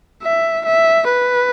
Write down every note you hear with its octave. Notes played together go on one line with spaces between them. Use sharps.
E5
E5
B4